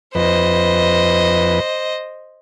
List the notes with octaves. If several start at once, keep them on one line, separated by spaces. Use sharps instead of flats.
F2 B4 C5 D#5